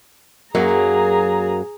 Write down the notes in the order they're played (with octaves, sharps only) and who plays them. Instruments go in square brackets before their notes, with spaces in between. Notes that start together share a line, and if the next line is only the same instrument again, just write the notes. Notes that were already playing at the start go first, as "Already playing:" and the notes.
[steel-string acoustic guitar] F#2 F#3 A#3 [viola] G#4 A#5